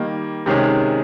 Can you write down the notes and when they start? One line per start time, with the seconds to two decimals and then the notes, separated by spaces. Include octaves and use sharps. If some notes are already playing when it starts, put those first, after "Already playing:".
Already playing: D#3 G3 A#3
0.46 C3 D#3 G#3 C#4 G#4